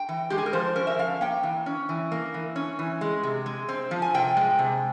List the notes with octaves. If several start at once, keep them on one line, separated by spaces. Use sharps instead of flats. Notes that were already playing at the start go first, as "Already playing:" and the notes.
Already playing: G5
E3
G#3 G4
G#4
A#4
F3 C5
C#4 A#4
E5
F3 F5
A#3 G5
E3
C#4
E3
A#3
E3
C#4
E3
G#3
C3
G#3
C4
F3
G#5
C3 G5
G#3
C3